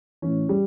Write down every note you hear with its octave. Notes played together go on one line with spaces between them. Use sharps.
A2 E3 C#4
G3